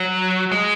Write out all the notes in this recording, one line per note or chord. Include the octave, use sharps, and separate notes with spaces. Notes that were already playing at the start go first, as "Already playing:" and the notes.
Already playing: F#3
G#3